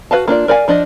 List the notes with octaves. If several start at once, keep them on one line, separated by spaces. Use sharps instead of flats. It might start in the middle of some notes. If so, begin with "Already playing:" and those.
F#4 B4 D#5 F5 A5
A#3 D4 F4 D5
A#4 D5 F5 G#5
F3 D4 D5 D#5